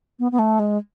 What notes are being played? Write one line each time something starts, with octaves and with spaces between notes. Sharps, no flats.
B3
B3
A3
G#3